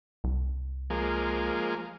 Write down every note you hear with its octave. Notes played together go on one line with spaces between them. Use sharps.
C2
F3 G#3 A#3